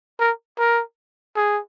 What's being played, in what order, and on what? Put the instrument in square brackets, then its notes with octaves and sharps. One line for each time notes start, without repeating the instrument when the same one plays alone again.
[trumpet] A#4
A#4
G#4